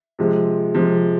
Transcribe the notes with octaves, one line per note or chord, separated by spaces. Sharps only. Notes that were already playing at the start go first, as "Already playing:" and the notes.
C3 F3 G#3
C3 F3 G#3